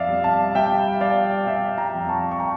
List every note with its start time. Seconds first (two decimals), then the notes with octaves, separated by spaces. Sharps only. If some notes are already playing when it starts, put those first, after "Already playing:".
Already playing: F2 D5 E5 F5
0.09 G3
0.24 F5 A5
0.55 G3 E5 G5
1.01 G3 D5 F5
1.47 G3 E5 G5
1.78 G5 A#5
1.94 F2
2.09 A5 C#6
2.31 C#6
2.40 G5 A#5